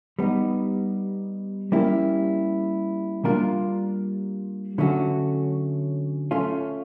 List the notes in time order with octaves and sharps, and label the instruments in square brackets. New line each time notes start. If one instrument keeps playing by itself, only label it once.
[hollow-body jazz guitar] G3 B3 D#4
G3 A#3 C#4 E4 G4
G3 A#3 D4 F4 A#4
D3 F#3 A3 C#4 F#4
A3 C#4 F4